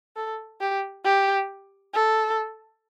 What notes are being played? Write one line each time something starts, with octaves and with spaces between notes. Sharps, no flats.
A4
G4
G4
A4